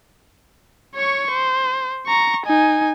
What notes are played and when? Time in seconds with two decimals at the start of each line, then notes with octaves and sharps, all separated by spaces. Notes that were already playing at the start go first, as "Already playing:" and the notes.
0.95 C#5 C#6
1.32 C5
2.07 A#5 C#6
2.46 D#4 G#5